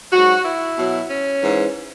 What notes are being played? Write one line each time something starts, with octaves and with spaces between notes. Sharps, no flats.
G#2 F#3 F#4
E4
B2 F#3
C#4
G#2 E3